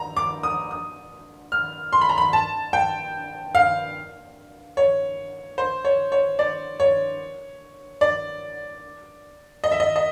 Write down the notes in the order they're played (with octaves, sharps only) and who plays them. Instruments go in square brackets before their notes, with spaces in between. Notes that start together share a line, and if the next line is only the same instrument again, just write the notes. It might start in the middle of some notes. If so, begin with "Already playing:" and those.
Already playing: [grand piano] A#5
D6
D#6
D#6
F6
C6
B5
A#5
B5
A5
G5
F5
C#5
C5
C#5
C#5
D5
C#5
D5
D#5
E5
D#5
D#5